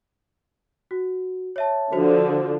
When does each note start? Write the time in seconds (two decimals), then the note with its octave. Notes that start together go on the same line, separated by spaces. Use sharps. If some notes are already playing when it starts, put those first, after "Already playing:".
0.91 F#4
1.56 C#5 E5 A5
1.92 D3 F3 F#4 C5